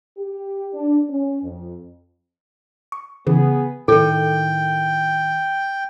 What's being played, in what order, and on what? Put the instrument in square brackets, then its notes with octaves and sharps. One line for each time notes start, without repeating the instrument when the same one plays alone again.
[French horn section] G4
D4
C#4
F2
[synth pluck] C#6
[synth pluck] C#3 E3 [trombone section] B3 G#4
[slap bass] A2 D#3 [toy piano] A4 [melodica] G5